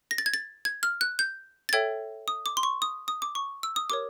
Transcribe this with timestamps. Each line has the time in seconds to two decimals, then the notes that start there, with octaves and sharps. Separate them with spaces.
0.11 A#6
0.18 A6
0.26 G#6
0.34 A6
0.65 G#6
0.83 F6
1.01 F#6
1.19 G6
1.69 A6
1.73 A4 C#5 E5 G5 G#6
2.28 D#6
2.46 D6
2.57 C6
2.63 C#6
2.82 D#6
3.08 D#6
3.22 D6
3.35 C#6
3.63 E6
3.76 D#6
3.90 G4 A#4 C#5 D6